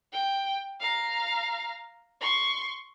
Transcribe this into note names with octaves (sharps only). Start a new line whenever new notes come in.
G5
F5 A#5
C6 C#6